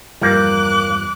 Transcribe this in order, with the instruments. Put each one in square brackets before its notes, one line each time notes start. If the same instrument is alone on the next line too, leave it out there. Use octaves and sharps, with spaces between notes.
[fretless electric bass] E2 G2 F3 [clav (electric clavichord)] G3 A#3 [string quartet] D6 F#6